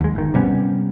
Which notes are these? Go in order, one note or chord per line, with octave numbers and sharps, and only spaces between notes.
D#2 G#3
G1 D#3
C3 G3 B3 C#4